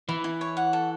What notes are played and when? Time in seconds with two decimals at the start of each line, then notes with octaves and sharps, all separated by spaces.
0.09 E3 E4
0.24 E4
0.41 C#5
0.57 F#5
0.73 A4